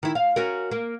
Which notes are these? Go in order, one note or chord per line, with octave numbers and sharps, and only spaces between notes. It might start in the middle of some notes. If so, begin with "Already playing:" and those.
D#3 E4
F5
C#4 F#4 A#4
A#3